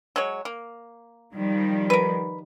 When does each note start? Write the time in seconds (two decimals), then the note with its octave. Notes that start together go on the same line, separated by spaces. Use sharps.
0.16 F#3 G#3 C#5
0.45 A#3
1.35 D#3 F3 G3
1.90 A#4 B4